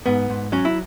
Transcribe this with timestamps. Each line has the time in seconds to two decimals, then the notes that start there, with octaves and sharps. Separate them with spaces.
0.06 G#2 B3
0.30 G#2
0.52 F#3 C#4
0.65 E4